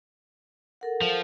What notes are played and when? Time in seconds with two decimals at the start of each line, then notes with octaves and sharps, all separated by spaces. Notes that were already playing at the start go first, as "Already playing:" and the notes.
0.81 A4 A#4 F#5
1.01 F3